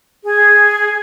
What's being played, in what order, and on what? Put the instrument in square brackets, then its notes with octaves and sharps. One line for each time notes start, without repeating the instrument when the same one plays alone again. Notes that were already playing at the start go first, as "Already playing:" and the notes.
[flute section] G#4